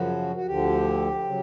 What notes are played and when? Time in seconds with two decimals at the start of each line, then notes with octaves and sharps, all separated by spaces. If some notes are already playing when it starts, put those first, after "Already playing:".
Already playing: F#2 C#3 F3 F#4
0.36 F#4
0.47 D2 D3 F3 G4
1.25 C#3 F#3